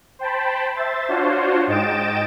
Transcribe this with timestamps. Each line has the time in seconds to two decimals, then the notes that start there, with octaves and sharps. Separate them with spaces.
0.19 C5 G5 A5 B5
0.75 C5 E5 A6
1.08 D4 F4 F#4 C5 C#5
1.67 G#2 D#5 G5 A6 D7 E7